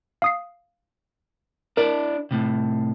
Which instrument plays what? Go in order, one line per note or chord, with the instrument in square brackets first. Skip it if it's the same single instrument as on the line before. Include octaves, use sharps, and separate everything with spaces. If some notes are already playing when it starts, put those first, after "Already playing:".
[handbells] F5 D#6 C7
[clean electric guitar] D4 E4 D5 [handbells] A#4
[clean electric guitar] A2 C3